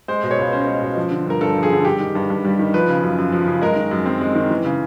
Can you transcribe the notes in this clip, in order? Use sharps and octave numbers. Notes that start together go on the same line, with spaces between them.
G#3 C5
B2
C#5
C#2
C#4 C5
G#3
B2
F3
D3
G2 A#4
G2 A4
F3
G#4
D3
G3 G4
D#3
G2
G2
G3
D#3
F3 B4
C#3
F#2
F#2
F3
C#3
G#3 A#4
D#3
F#2
C4
G#3
D#3
E3
C#3